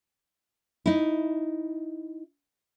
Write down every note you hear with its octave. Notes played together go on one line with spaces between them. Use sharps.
D#4 E4